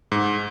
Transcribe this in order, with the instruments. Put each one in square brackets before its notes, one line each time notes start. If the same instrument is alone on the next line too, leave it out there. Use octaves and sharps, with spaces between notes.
[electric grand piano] G#2